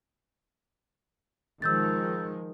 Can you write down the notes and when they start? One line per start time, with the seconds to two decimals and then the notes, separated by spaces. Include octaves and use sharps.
1.62 D#3 F3 G#3 E6 G6 A6